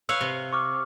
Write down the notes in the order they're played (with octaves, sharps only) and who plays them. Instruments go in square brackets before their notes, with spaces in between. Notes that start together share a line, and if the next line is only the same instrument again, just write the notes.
[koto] B4 C#5 F5 [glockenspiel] E6
[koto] C3
[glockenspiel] C#6 D6 F6